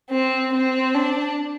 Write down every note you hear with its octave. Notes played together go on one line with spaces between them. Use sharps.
C4
C4
D4